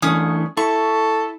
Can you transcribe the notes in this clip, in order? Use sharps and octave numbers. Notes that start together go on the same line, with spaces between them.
E3 A3 C#4 D4 D#6
E4 A4 C#6